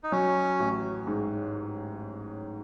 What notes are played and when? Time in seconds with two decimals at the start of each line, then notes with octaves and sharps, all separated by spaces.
0.03 D#4
0.12 F#3 C#4
0.60 A1
1.07 G#2